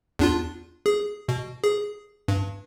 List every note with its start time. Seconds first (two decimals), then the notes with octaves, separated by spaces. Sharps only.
0.19 E2 D4 F4
0.86 G#4
1.29 B2
1.64 G#4
2.28 G2